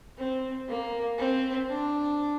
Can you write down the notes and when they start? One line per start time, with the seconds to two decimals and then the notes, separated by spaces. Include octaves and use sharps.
0.18 C4
0.69 A#3
1.18 C4
1.70 D4